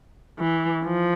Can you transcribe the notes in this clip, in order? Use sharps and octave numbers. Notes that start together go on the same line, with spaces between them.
E3
F3